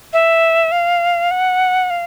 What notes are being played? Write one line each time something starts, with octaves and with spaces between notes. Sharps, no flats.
E5
F5
F#5
F5